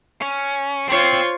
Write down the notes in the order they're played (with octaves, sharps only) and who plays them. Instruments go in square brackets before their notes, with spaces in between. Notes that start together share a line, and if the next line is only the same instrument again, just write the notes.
[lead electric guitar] C#4
[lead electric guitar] C4 [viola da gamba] F4 C5 C#5